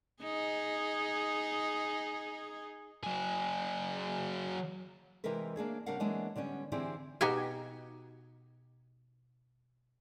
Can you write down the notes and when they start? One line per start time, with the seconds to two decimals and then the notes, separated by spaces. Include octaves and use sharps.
0.23 D#4 G#4
3.03 F#3 G#4
5.24 C3 E3 G#3 C4 A#4 B4
5.56 A#3 D4 G#4 C#5
5.86 C#3 G3 D4 A#4 F5 F#5
6.00 E3 F#3 G#3 A#3 B3 D4
6.36 D3 G3 B3 C#4
6.72 D3 E3 C4 E4 G4 G#4
7.21 B2 D#4 F#4 G4 G5 G#5